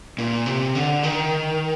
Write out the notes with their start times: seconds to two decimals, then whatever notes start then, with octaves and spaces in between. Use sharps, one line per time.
0.18 A#2
0.46 C3
0.75 D3
1.03 D#3